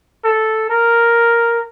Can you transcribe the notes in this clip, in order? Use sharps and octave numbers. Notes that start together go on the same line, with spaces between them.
A4
A#4